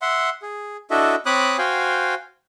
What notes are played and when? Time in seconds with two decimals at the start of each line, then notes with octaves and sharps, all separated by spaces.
0.02 E5 F#5 C6
0.42 G#4
0.91 D4 E4 F#4 A4 D#5 E5
1.26 C4 C#5 B5 D6 D#6 F#6
1.58 F#4 C5 F5 G5 G#5